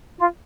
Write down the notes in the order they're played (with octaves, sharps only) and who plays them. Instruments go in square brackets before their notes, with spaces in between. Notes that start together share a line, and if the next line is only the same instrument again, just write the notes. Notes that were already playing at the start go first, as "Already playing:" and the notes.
[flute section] F4